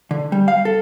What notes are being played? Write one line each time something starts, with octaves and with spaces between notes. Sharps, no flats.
D3
G3
F5
A4